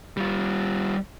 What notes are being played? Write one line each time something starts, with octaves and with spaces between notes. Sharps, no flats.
G3 F4